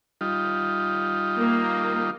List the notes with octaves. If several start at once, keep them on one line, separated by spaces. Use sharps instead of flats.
G3 D#4 F4
A#3